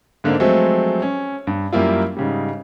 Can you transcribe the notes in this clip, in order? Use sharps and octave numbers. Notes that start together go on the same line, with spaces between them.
G#2 D3 A#3 C4 D4
F3 F#3 G#3 A3 C4
C#4
G2
F#2 G3 A#3 E4 F4
G#2 C#3 G3